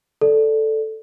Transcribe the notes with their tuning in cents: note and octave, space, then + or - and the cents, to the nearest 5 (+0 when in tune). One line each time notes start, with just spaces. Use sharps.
A4 +0 D5 +0